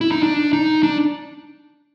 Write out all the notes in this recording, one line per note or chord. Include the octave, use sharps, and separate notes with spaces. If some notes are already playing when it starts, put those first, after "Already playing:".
E4
D#4
D4
D#4
D4